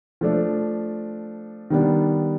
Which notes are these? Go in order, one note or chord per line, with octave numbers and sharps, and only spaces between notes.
F3 A3 D4
D#3 G3 B3 D4